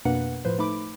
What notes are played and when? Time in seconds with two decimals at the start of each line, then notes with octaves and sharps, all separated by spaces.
0.05 F2 B2 A#3 D4 B4 F#5
0.45 A2 F3 B4 C5
0.59 A3 D#4 B5 D6